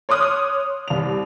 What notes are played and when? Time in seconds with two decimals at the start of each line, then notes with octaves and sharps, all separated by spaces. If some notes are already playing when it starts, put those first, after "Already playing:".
0.09 C#5 C6 D6 D#6 F6 F#6
0.88 C2 F7